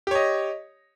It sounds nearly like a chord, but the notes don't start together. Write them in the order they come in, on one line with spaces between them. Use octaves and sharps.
G4 C#5 D#5